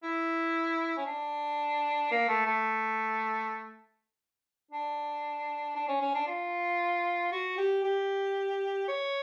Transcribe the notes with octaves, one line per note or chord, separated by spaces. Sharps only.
E4
C#4
D4
A#3
A3
A3
D4
D4
C#4
C#4
D4
F4
F#4
G4
G4
C#5